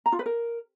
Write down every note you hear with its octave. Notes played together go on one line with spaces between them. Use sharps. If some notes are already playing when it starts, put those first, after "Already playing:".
A#5
F4
B4
A#4